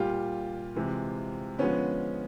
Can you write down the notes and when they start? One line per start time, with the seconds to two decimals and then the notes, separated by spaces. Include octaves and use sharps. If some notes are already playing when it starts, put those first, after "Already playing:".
Already playing: A#2 G3 F4 G4
0.76 C3 E3 G#3
1.58 D3 F3 G#3 B3 C#4